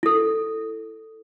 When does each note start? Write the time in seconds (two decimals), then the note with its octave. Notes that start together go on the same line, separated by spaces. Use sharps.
0.03 E4 A4